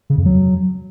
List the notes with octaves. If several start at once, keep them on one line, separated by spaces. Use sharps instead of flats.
C#3
F2
F#3